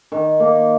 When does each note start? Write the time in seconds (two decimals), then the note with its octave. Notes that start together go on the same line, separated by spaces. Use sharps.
0.12 D#3
0.40 A#3